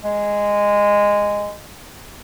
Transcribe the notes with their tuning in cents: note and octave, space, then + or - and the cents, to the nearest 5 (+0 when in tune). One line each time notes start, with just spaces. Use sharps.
G#3 -10